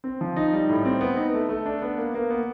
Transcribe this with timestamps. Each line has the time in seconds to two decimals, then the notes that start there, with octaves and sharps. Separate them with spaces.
0.04 C4
0.21 F3
0.36 D#4
0.53 G3
0.69 A2
0.85 C4
1.01 B3
1.17 D#4
1.34 A3
1.49 A3
1.66 D4
1.82 B3
1.98 A#3
2.15 A#3
2.30 B3